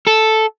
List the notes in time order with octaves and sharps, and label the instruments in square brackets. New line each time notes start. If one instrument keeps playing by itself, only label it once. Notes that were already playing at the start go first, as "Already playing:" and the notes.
[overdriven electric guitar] A4